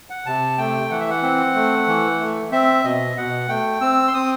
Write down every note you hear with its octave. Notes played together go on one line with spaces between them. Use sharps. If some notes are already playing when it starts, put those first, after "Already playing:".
F#5
C3 A5
A3 G5
E3 F#5
E5
F#5
C4
A3
E3
A3
C4 E5
B2 D#5
B2 F#5
A3 G5
C4 E6
C6
C4 D#6